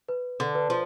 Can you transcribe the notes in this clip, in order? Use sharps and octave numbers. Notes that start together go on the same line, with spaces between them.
B4
D3
B4
F3